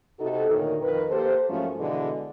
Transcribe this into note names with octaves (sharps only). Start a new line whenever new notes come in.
C3 D#4 F#4 A4
D2 A#2 D#3 D#4 A#4 C#5
F2 D#3 A#4 B4
A#3 G4 A4 C5
G#2 F3 F#3 A3 A#3 C#4
B2 D3 E3 G#3